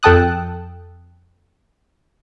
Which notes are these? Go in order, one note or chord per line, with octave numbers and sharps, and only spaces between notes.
F2 A4 G5 A5 D#6 F#6